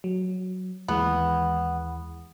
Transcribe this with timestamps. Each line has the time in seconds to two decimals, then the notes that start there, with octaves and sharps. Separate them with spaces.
0.04 F#3
0.88 D#2 E3 G#3 B3